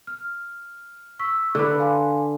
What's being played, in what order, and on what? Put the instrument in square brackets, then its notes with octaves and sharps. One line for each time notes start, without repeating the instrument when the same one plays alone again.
[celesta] F6
C#6 E6 B6
[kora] D3 B4 [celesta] B5 D6 F#6
[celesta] F5 G#5 C6